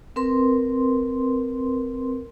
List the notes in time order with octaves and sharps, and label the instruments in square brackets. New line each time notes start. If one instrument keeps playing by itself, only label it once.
[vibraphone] C4 A#4 B4 C6